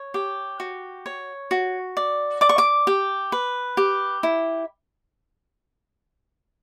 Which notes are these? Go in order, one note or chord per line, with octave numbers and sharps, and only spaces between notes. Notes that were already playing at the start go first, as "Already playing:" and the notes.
Already playing: C#5
G4
F#4
C#5
F#4
D5
D5 D6
C#6
D6
G4
B4
G4
E4